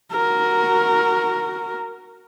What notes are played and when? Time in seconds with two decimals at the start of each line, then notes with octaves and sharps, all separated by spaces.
0.11 F#4 A#4